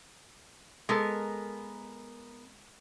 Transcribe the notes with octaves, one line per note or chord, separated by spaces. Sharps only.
G#3 B3 A4 A#4